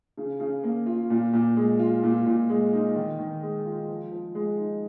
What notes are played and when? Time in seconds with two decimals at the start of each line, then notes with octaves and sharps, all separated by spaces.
0.18 C#3
0.40 C#3
0.64 A#3
0.86 F4
1.10 A#2
1.33 A#2
1.57 G#3
1.79 F4
2.03 A#2
2.26 A#2
2.50 G#3
2.73 D#4
2.96 D#3
3.19 D#3
3.43 G#3
3.65 F4
3.88 F3
4.11 F3
4.35 G#3
4.58 D#4